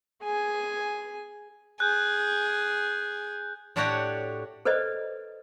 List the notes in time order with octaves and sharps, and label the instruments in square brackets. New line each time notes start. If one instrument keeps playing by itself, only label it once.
[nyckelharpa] G#4 G#5
[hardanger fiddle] G#4 [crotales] F#6 G6
[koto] A2 D4 F#4 G4 C#5 F#5
[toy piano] A4 B4 C5 D5 D#5